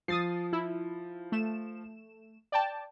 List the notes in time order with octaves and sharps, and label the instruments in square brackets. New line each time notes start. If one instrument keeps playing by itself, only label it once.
[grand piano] F3 [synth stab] D#6 A6 C7
[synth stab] E4
A3 E7
D5 G5 A5